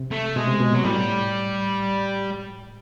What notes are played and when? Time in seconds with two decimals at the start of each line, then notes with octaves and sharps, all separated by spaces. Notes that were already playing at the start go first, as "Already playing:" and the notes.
Already playing: C3
0.11 A3
0.36 B2 G#3
0.48 C3
0.60 B2
0.73 A#2 F#3
0.84 A2 G3